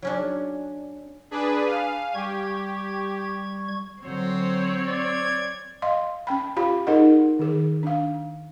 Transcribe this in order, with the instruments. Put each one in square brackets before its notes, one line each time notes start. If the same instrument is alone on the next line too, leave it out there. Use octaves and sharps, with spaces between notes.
[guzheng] F#3 C#4 D4
[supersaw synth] D4 G#4 B4
[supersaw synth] F5 [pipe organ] G#5
[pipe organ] G3 C#6 G#6 [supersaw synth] G4
[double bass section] D3 F#3 [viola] C4 C#5 [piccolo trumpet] C5
[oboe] D5 [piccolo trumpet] G#6
[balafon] D#5 F5 C6
C#4 G5 B5
F4 G4 F5 B5
D#4 G#4 A#4 D#5 F#5
D#3 G#4
D4 F5